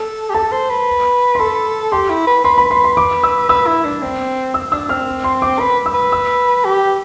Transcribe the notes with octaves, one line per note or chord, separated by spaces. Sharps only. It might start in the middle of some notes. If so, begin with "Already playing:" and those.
Already playing: A4
G4
A4 A5
C5
B4
C6
A4 B5
G4 C6
E4
B4
B4 C6
B5
B4 C6
C6
D6
E6
B4 E6
E4
D4
C4
E6
D4 E6
C4 F6
C6
D6
B4 D6
E6
B4
E6
G4